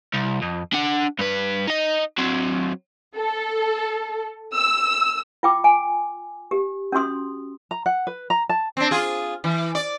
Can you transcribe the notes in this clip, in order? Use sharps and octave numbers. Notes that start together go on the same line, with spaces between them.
C2
F2
D4 F#5
G2 B4
D#4 D#5
F#3 C4
A4
E6
F4 G5 D6
G#5
G4
C#4 D4 F#4 C6 D#6
A#5
F#5
B4
A#5
A5
C4 D4
F4 G#4
E3
D5